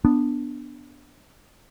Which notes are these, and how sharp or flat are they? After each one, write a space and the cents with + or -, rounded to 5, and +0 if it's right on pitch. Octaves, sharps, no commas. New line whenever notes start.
B3 +0 D4 +0